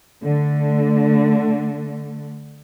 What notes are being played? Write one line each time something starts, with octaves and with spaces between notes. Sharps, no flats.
D3 A3